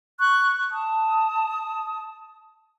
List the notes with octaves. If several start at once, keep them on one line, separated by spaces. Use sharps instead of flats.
C#6 F#6
A5 D#6